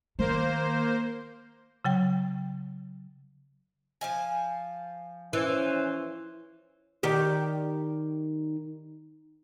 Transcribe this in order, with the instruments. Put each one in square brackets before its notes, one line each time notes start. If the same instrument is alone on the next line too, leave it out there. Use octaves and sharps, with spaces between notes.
[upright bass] D#3 [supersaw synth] A#3 C5
[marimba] C#3 F#3 G5
[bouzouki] F3 F5 G#5
[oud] E3 [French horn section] C#4 C5
[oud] D#3 G4 D5